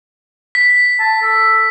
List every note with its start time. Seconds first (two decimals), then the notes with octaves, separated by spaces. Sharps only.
0.55 B6
0.99 A5
1.22 A4